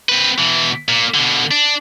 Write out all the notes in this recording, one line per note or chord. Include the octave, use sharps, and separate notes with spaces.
C4 B4
B2 E3
A#2
B2 D3
D4